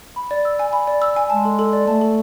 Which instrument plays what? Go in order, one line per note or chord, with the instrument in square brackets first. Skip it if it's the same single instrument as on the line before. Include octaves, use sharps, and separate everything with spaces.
[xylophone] B5
D5
E6
G#5
B5
D5
E6
G#5
[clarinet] G#3 [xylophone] A5
[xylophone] A4
A4
D5
[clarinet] A3 [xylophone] A5
[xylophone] A4